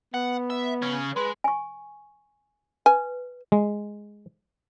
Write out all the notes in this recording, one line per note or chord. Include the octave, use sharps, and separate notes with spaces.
B3 F#5
E5
C#3 C#4
G#3 B4
G#5 C#6
B4 G#5
G#3